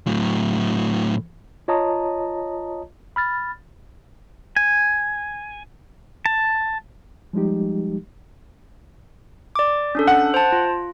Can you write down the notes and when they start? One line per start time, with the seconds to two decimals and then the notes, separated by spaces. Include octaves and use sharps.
0.07 A2 F#3
1.68 F4 C#5 D#5 A5 A#5 D#6
3.16 B5 F6 A6
4.56 G#5
6.26 A5
7.33 F3 G3 G#3 D#4 G4
9.55 D5 D6
9.95 C#4 D4 A4
10.07 F#5
10.34 C5 A5
10.52 F4